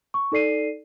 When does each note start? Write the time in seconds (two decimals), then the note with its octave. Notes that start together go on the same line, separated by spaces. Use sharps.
0.14 C#6
0.32 D#4 A4 D5 C7 D#7